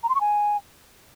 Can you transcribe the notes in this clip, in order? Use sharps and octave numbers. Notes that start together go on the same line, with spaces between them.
A#5
C6
C#6
G#5